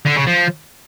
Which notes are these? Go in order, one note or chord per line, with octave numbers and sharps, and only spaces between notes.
D3
C#3
F3